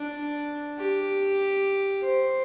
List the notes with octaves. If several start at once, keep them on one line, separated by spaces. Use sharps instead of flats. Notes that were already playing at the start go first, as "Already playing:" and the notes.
Already playing: D4
G4
C5